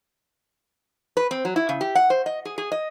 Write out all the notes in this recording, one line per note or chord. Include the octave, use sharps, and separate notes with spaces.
B4
C4
F#3
E4
C#3
G4
F#5
C5
D#5
G#4
G#4
D#5